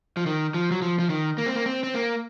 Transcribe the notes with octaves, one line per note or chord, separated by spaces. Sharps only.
F3
D#3
F3
F#3
F3
F3
D#3
A#3
C4
A#3
C4
C4
A#3